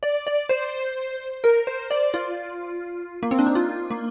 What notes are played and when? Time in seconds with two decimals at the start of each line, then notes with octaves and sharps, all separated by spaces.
0.03 D5
0.27 D5
0.49 C5
1.44 A#4
1.67 C5
1.91 D5
2.14 F4
3.23 A#3
3.31 C4
3.39 D4
3.47 D#4
3.55 F4
3.90 A#3